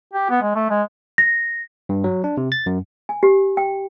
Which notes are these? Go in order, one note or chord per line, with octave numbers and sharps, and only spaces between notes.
G4
B3
G#3
A3
G#3
A#6
G2
F#3
D4
C3
A6
F#2
G#5
G4
G5